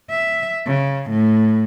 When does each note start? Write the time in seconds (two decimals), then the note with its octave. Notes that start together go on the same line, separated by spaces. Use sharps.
0.11 E5
0.67 C#3
1.10 A2